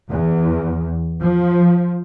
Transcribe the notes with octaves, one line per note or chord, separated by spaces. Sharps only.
E2
F3